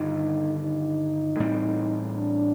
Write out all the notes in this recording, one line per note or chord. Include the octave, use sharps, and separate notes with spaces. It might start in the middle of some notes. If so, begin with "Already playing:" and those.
Already playing: G1 G2 D#3 D#4
D#4
A1 A2 G3 C4
D4